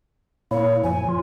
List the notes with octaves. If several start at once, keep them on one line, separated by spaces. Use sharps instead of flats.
A#2 A#3 E4 C#5
F#2 F3 G#5
F4